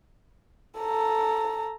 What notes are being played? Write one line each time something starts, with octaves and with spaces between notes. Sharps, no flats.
A4 A#5